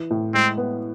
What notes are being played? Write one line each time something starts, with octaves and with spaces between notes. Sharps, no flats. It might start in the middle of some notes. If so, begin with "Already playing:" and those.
Already playing: E3
A2
G#3 C4
B3